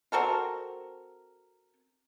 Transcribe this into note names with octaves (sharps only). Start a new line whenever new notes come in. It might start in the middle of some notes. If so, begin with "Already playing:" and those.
C4 F#4 A4 A#4